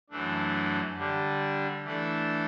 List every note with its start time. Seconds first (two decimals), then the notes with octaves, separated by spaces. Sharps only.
0.10 F#2 E3 A3 D4
0.97 D3 G3 D4
1.84 E3 A3 D4 A4